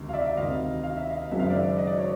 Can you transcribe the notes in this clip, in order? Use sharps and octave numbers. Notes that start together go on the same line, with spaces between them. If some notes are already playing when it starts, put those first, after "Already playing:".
Already playing: E1 D2 C3 D#3
F5
D5 E5
E1 D2 C3 D#3 D#5 F5
F5
E5
D#5 F5
F#1 F#2 D#3 G#3 E5
F5
D5 E5
D#5
D5
C#5